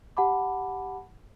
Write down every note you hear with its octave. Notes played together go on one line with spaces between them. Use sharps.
G4 F#5 A5 B5 D6